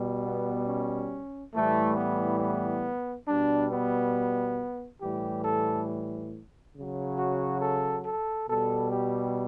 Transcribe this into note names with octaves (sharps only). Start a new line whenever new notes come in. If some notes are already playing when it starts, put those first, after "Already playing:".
Already playing: B2 G3
B3
C#4
A2 E3 G3 A3
B3
B3
B2 G3 D4
B3
A2 E3 G3 G4
A4
C#3 F#3
F#4
A4
A4
B2 G3 A4
G4